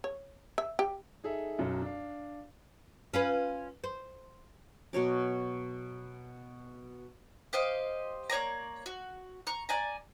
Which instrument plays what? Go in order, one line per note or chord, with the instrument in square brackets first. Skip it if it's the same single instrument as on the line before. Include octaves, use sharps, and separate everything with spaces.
[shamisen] C#5
E5
G4
[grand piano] D#4 G#4 A4 E5
B1 F#2 F#3
D4 F5
[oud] C#4 F4 B4
C5
[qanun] B2 F#3 C#5 D6
[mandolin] G4 C5 D#5 F5
A#3 C#5 D5 A#5
F#4
A#5 C#6
D5 G#5 A#5